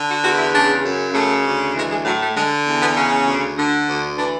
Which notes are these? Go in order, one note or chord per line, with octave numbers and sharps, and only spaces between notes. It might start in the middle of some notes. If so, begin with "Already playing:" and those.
Already playing: D3
F#4
E2 F#4
E4
C#3 D4
F#2
C#3 A3
D2
E3 G#3
G#3
A2 F#3
A3
D3 G#3
E2
B3
C#3 C#4
D2
D3
D2
E3 D4